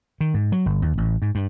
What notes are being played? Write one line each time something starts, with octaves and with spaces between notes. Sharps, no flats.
D#3
G#2
F#3
G1
D#2
A1
G#2
G2